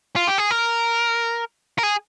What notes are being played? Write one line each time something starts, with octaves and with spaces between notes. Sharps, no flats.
F4
G4
G#4
A#4
A#4
G#4